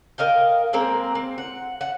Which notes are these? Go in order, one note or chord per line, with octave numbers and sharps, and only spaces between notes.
A#4 D#5 F5 G5
G#3 A#3 C4 A#5
C4
F#5
F#5